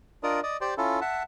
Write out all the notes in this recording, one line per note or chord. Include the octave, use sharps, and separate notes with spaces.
D4 F4 A#4 D5 D#5
D5 D#5
G4 C5 D5
C#4 E4 F4 A4
E5 F#5 A5